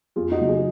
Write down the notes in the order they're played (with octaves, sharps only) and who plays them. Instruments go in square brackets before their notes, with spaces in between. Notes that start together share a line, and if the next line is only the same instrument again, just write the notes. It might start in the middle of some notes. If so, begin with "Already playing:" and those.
[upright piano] F2 F4 G#4
D#4 F#4
C#3 F#3
F4 G#4